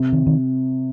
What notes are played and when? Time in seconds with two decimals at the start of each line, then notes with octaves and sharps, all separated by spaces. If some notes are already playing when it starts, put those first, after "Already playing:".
Already playing: C3
0.13 D#3
0.27 D#3